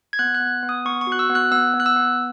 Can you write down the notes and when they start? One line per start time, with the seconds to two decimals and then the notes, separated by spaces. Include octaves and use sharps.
0.13 G#6
0.19 B3 F#6
0.35 F#6
0.40 B3
0.63 B3
0.69 D#6
0.85 B3 C#6
1.01 C#6
1.07 F#4
1.12 F#6
1.19 E6
1.30 B3
1.35 F#6
1.51 B3 E6
1.74 B3
1.80 F#6
1.86 E6
1.96 B3